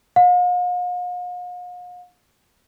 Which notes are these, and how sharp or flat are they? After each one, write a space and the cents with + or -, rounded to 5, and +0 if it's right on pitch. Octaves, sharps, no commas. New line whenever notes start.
F5 +45